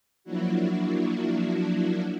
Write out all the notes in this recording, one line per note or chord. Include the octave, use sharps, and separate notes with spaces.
F3 F#3 A#3 D4 E4 F#4